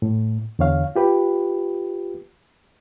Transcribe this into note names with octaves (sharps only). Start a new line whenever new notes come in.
A2
E2 D3 C#5 F5
F4 G4 B4